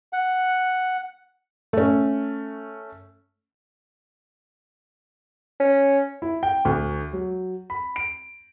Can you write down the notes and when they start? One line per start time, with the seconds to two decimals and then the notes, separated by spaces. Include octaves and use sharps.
0.13 F#5
1.73 A3 C#4
5.60 C#4
6.22 E4
6.43 G5
6.65 D2
7.13 F#3
7.70 B5
7.96 D7